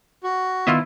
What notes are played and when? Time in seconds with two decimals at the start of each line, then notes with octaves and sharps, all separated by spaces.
0.24 F#4
0.67 D#3 B3 E4 F4 D#5 E5